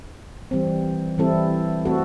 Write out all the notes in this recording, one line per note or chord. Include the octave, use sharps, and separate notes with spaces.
E3 G3 C4
E3 G3 C4 E4 A4
A3 C4 F#4 A4